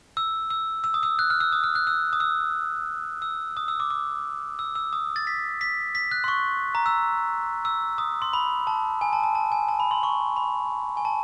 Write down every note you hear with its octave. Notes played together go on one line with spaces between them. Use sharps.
E6
E6
E6
D#6
E6
F#6
F6
E6
D#6
F6
F#6
E6
D#6
E6
E6
D#6
E6
D6
D6
E6
E6
D#6
A6
B6
B6
B6
F#6
C6
C#6
A#5
E6
E6
D#6
C6
B5
A5
G#5
A5
A5
A5
G#5
A5
B5
C6
C#6
B5
G#5
A5